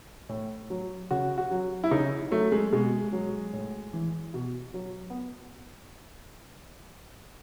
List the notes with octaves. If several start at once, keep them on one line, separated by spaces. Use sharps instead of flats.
A2
F#3
C#3 F#4
F#4
F#3
E4
C#3 D#4
F#3 A3
G#3
B2 G#3
F#3
A2
E3
B2
F#3
B3